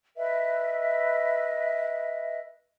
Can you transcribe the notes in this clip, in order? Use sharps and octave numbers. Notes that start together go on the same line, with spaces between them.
B4 D#5 E5